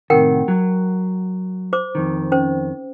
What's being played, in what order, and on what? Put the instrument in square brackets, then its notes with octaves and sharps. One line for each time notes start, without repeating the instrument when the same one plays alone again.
[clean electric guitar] A2 C3 D#3 [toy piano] A#4 F#5 G5
[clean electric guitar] F#3
[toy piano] C5 D6
[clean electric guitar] F2 D#3
[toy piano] C#4 C5